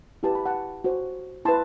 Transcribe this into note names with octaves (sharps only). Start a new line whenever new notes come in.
E4 G4 B4 A5
B5
F#5 A5
F#4 C5
E4 B4 A5 C6